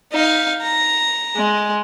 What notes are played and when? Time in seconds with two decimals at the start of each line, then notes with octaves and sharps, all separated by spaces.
0.12 D#4 F5
0.62 A#5
1.36 G#3